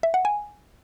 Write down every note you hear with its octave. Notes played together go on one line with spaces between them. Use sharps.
E5
F#5
G#5